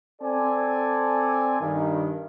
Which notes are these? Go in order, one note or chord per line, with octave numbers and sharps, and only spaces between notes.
C4 A4 D5 G#5
G2 D#3